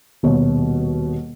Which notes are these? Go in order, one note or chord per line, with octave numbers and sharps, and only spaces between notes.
D#1 B2 C#5